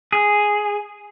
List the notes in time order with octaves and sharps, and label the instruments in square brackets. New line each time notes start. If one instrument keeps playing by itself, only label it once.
[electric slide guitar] G#4